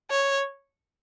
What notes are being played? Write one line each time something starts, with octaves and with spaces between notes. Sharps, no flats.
C#5